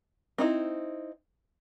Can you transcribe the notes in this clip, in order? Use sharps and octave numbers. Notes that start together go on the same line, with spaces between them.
C4 D#4 E4